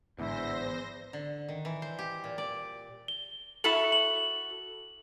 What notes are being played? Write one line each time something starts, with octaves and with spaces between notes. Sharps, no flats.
A1 E2 G#2 D3 E4 C5 A#6
D3
D#3
E3
C5
G4
A#2
D5
G7
E4 F#4 A4 F#7
F#7